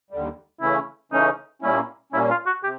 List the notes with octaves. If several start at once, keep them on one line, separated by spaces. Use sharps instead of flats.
D#2 D3 G3
C#3 E3 A3 C#4 E4
C#3 E3 A3 C#4 D#4
A#2 G3 A#3 C#4 E4
A#2 G3 A#3 C#4 E4
F4
F#4
C3 G4